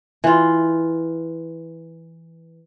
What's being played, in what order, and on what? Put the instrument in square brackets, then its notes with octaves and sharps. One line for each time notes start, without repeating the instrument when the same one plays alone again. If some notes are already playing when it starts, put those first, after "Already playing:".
[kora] E3 F4